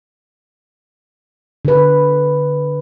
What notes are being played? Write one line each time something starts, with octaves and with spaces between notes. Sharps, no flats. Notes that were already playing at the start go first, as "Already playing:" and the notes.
D3 B4